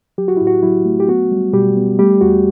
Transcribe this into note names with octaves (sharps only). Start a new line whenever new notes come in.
F#3 G4
F#4
A2 E4
F#4
F#3 E4
A3
G4
B3 F#4
G3
B2 G3 G4
B3
G3 A3 G4
E2 F#4